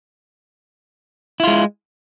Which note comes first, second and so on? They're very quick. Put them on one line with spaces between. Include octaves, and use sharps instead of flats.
E4 F4 G#3